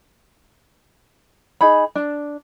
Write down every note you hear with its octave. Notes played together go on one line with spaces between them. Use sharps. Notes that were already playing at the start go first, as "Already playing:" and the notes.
D#4 G#4 B5
D4